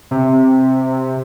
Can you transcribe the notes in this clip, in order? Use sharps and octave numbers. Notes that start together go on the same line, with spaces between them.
C3